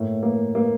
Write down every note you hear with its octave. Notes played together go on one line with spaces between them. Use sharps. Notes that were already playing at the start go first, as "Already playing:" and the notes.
Already playing: A2 A#3
A#3
A#3